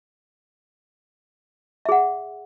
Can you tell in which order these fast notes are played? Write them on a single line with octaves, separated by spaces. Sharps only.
E5 G#4 F#5